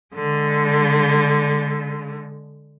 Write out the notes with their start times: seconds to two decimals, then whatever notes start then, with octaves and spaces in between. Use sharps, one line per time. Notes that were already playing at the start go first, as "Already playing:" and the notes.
0.15 D3 G#3